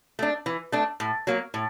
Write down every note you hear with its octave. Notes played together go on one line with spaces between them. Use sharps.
A3 D4
E3
A3 D4
A2
F#3 A#3
A2